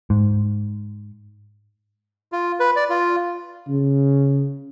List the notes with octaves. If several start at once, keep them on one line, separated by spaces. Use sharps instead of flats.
G#2
F4
B4
D5
F4
C#3